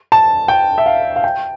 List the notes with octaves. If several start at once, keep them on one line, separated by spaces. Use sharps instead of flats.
A5
G5
E5
F5
F5
G5